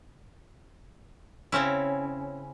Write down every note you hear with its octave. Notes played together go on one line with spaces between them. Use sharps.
C#3 C4 C#4 E4